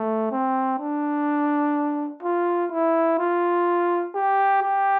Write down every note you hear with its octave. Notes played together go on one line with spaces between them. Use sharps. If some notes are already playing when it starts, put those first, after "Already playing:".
Already playing: A3
C4
D4
F4
E4
F4
G4
G4